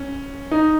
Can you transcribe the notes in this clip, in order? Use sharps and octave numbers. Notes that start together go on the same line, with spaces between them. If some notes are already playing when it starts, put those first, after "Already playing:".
Already playing: C#4
D#4